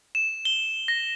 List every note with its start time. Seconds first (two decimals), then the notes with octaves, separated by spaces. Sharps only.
0.15 E7
0.45 G7
0.88 A#6